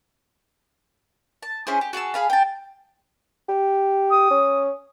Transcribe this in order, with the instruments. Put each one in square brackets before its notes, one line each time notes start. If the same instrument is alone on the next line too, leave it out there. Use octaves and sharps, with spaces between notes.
[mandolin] A5
C#4 E4 G#4 C5
G4
F#4 G#4 A5 E6
G#4 F5 B5
G5 A5
[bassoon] G4
[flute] D#6
[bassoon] C#4